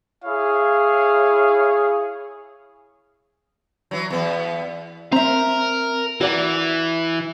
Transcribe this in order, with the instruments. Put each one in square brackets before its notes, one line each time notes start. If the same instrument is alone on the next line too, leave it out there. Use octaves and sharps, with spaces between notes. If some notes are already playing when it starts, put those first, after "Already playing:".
[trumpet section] E4 G#4 C#5 F5
[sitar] E3 F#3
E2 B3
[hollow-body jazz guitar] C4 E5 [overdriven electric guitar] A#4
[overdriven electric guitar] E3 [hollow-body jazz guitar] F#4 D5 F#5